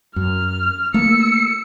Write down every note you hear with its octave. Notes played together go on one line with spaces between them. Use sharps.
F#2 F6
A3 A#3 E6 C#7